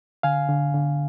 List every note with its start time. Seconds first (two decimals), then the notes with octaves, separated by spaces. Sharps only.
0.23 D3 F5 G#5
0.49 D3
0.74 D3